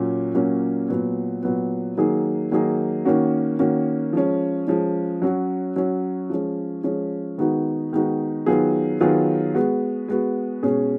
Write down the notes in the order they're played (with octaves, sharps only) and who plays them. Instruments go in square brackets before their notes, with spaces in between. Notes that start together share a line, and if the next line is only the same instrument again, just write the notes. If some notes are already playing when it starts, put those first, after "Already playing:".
Already playing: [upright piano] A#2 F#3 A#3 C#4
A#2 F#3 A#3 C#4
A#2 F#3 B3
A#2 F#3 B3
D#3 F#3 A#3 D#4 G#4
D#3 F#3 A#3 D#4 G#4
D#3 A#3 C#4 F#4
D#3 A#3 C#4 F#4
F3 G#3 C#4
F3 G#3 C#4
F#3 C#4 F#4
F#3 C#4 F#4
F3 G#3 C#4
F3 G#3 C#4
D#3 G#3 B3 D#4 F#4
D#3 G#3 B3 D#4 F#4
D#3 F#3 B3 F4 G#4
D#3 F#3 B3 F4 G#4
G#3 B3 F#4
G#3 B3 F#4
B2 G#3 C#4 G#4